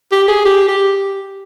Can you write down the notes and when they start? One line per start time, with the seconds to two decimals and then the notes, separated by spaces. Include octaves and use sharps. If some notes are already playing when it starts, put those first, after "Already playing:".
0.12 G4
0.28 G#4
0.45 G4
0.68 G4